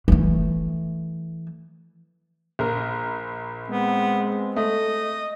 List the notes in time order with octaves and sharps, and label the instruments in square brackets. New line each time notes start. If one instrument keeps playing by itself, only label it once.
[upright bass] E3 A3
[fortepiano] A#1 A#4
[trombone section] G#3 C4 [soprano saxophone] B3
[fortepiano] A3 [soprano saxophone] D#5